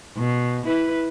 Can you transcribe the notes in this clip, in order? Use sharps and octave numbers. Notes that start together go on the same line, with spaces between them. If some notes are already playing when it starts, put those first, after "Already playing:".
B2
E4 B4